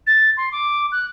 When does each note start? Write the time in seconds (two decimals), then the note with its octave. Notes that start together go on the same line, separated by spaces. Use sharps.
0.07 A6
0.37 C6
0.52 D6
0.92 F#6